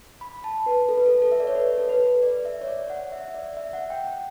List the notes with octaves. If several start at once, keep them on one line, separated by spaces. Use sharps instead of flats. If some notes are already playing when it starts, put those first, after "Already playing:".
B5
A5
B4
A4
B4
A4
A4
E5
D5
C#5
B4
A4
B4
D5
E5
C#5
D5
F#5
E5
D5
E5
F#5
G5
G5